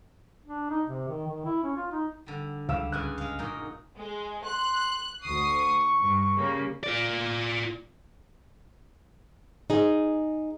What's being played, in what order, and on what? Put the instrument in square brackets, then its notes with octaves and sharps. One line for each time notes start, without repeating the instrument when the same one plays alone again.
[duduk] D4
D#4
C3
D#3
D#3
E4
C#4
F4
D#4
[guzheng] D3 G3
[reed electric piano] C#2 [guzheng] G3 [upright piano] F5 E6 E7
[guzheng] G2 C#3 G#5 [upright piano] F#6
[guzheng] G#3 F5
F#2 A#2 D#4
[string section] G#3
[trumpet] C6 [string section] F#6
[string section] D2 D#6 C7 [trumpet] C#6
[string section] G2
C#3 G3 A#3
[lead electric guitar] F4 D5
[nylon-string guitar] D#4 G#4